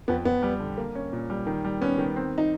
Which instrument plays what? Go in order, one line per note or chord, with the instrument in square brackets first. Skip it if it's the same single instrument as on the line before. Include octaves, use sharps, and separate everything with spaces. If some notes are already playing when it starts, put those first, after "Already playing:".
[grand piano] F2 [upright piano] B3
[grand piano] F2 [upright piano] B3
[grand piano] G3
D3
A#3
C#4
A#2
G3
D#3
G3
[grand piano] B3 [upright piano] C#4
[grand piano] D#3
C4
[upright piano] D#4